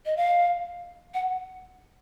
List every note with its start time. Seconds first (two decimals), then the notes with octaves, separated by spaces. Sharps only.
0.06 D#5
0.17 F5
1.14 F#5